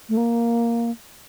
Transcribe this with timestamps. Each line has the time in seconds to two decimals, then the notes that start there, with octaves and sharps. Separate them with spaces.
0.09 A3
0.17 A#3